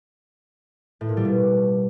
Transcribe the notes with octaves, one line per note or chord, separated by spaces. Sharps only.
A2
A#2
G3
B2